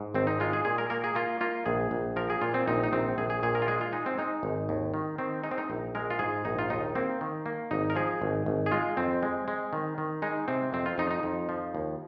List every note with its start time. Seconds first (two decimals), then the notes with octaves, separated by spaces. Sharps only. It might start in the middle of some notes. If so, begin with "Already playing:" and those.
Already playing: G#2
0.14 G#1 C4
0.27 D#4
0.40 G#3 F4
0.53 G#4
0.65 A#2 G#4
0.78 A#4
0.90 A#3 A#4
1.04 G#4
1.15 A#3 F4
1.41 A#3 F4
1.66 A#1 G#4
1.91 A#1
2.16 F3 A#4
2.30 G#4
2.41 A#2 F4
2.54 C4
2.68 A#1 D#4
2.84 D#4
2.93 A#1 C4
3.18 A#1 G#4
3.30 G#4
3.43 A#2 G#4
3.55 A#4
3.62 F4
3.68 G#3 G#4
3.81 F4
3.93 G#3 D#4
4.06 C4
4.18 G#3 D#4
4.43 G#1
4.69 D#2
4.94 D#3
5.18 D#3 C4
5.44 G#3 D#4
5.51 C4
5.58 D#4
5.70 A#1
5.95 G#3 A#4
6.10 F4
6.19 G#2 G#4
6.45 A#1 D#4
6.59 F4
6.70 D#2 D#4
6.95 A#3 C4
7.21 D#3
7.46 A#3
7.71 G#1 D#4
7.90 A#4
7.95 F3 G#4
8.22 G#1
8.46 G#1
8.66 G#4
8.71 G#3 F4
8.97 F2 C4
9.23 G#3
9.48 G#3
9.73 D#3
9.98 D#3
10.22 G#3 D#4
10.48 C3 C4
10.73 F2 C4
10.86 F4
10.98 F2 D#4
11.11 D#4
11.23 F2
11.49 F3
11.75 D#2